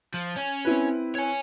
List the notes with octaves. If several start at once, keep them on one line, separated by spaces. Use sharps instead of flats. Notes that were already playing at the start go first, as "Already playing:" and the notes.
F3
C#4
C4 E4 B4
C#5 G#5